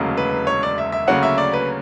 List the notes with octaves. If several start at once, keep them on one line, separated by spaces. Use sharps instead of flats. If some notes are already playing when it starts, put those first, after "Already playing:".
Already playing: E1 D2 C#3 F#3 A#3
B4
C#5
D5
E5
E5
D2 C#3 F#3 A#3 C#4 F#5
E5
D5
B4